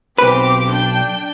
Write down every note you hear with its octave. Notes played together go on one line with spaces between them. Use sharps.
B1 C4 G4 B4 D6
D4 G5 G6